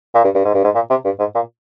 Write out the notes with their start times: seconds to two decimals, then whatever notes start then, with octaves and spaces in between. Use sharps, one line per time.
0.15 A#2
0.24 G2
0.35 G2
0.45 G#2
0.54 G2
0.64 G#2
0.75 A#2
0.90 C3
1.05 G2
1.19 G#2
1.35 A#2